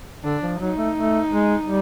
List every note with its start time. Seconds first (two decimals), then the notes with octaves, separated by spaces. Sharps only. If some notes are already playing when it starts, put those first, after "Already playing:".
0.24 D3 D4
0.42 F3
0.59 F#3 D#4
0.77 A3
0.95 A3
1.30 G#3
1.66 G3